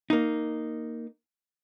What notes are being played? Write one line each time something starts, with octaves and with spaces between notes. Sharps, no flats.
A#3 D#4